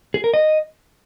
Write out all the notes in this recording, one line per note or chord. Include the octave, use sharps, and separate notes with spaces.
G#4
A#4
D#5